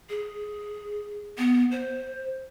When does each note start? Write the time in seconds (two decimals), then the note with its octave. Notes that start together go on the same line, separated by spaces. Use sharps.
0.10 G#4
1.38 B3
1.72 C5